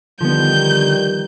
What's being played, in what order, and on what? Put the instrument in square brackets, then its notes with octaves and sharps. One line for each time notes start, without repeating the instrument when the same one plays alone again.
[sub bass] D3 [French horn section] D#3 G3 [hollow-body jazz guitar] F3 B3 [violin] G6